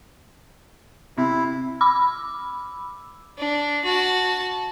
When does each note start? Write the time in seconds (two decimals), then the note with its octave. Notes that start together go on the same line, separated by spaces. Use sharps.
1.18 C3 E4
1.81 B5 D6 E6
3.39 D4
3.85 F#4 A5